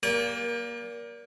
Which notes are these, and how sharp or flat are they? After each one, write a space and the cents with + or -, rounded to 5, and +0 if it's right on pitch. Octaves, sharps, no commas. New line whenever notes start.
A#3 +20 D5 -30 G5 +45